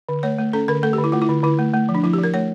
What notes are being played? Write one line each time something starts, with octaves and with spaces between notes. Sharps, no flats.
D3
A3 C#5
A3
C#4 A4
D3 A#4
A3 A4
G4
D3
E4
A3 F4
E4
D3
D3 E4
A3
A3
F3
D4
F3 E4
G4
F3
A#4
A3 C#5